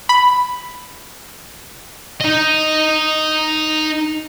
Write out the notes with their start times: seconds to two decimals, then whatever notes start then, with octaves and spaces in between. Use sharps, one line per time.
0.09 B5
2.21 D#4 D#5